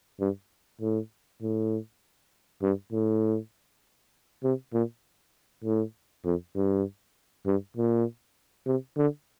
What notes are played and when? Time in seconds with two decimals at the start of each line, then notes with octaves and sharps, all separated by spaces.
0.20 G2
0.81 A2
1.41 A2
2.62 G2
2.92 A2
4.43 C3
4.73 A#2
5.64 A2
6.25 F2
6.56 G2
7.46 G2
7.77 A#2
8.66 C3
8.97 D3